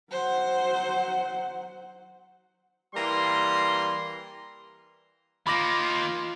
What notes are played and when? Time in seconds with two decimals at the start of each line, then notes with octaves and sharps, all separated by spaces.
0.11 F#3 C5 F#5
2.95 E3 G3 A#3 A#5 C6
5.47 D#3 A#3 F4 B5 D6 A#6